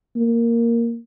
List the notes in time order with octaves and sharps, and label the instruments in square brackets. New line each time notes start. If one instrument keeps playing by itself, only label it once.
[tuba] A#3